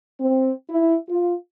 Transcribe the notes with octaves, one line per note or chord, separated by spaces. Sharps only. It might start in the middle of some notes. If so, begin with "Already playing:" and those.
C4
E4
F4